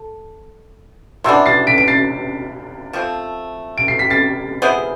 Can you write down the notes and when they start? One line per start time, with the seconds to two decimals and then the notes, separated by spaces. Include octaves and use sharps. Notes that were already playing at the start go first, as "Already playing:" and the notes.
Already playing: A4
1.24 C3 E3 B3 D4 C6 E6
1.46 A6 C7
1.67 B6 D7
1.78 D7
1.88 A6 C7
2.93 F3 A3 C4
3.78 D7
3.88 C7
3.99 B6
4.10 A6 C7
4.62 B3 E4 G#4 C5